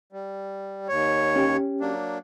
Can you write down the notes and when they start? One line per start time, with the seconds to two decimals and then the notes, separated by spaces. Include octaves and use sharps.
0.13 G3
0.88 D#2 C#5
1.36 C#4 G4
1.81 F#3 A#3 D4